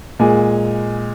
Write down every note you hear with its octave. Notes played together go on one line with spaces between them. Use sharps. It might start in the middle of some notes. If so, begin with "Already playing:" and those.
A#2 G#3 G#5